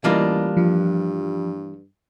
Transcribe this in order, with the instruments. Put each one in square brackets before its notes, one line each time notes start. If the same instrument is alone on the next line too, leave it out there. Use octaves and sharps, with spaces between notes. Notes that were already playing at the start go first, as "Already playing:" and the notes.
[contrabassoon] A1 [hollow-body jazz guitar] E3 G3 A#3 [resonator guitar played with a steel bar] D4 F4 D#5
[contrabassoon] G2 [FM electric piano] F3